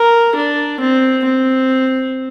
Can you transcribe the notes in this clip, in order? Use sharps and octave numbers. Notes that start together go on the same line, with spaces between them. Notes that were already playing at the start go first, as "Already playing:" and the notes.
Already playing: A#4
D4
C4
C4